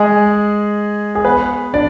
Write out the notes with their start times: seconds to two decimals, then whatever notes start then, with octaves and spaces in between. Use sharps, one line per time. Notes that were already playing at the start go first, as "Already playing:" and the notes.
Already playing: G#3 G#4
1.15 G#4
1.25 B3 B4
1.74 D4 D5